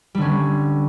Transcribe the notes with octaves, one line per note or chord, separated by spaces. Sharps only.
D3 G3 C#4